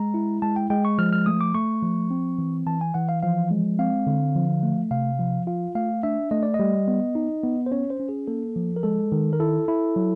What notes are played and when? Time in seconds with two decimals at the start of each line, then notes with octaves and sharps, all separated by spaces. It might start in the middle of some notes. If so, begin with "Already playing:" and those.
Already playing: G#3 A#5
0.14 E4
0.42 G#3 A5
0.56 G5
0.70 G#3 G5
0.85 C#6
0.98 F3 F6
1.13 F6
1.26 A3 D#6
1.41 D6
1.55 A3 C#6
1.82 F3
2.11 C4
2.39 E3
2.66 E3 A5
2.81 G#5
2.94 E3 F#5
3.09 F5
3.23 F3 F5
3.51 G#3
3.79 C4 F5
4.07 D3
4.35 F3
4.63 A3
4.91 C3 F5
5.19 F3
5.47 F4 F5
5.75 A3 F5
6.03 D4 E5
6.31 A3 D#5
6.43 D5
6.54 D#5
6.59 G3
6.88 B3
7.15 D#4
7.44 B3
7.66 C5
7.72 C#4 C#5
7.90 C5
8.00 C#4
8.09 G#4
8.28 A#3 A4
8.56 F3
8.76 A#4
8.83 G#3 A4
9.12 D#3
9.33 A#4
9.40 E4 A4
9.68 E4
9.96 F#3